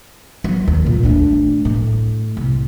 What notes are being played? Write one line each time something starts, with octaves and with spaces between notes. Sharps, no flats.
F#3
D#2
A#2
A3 D4
A2
C2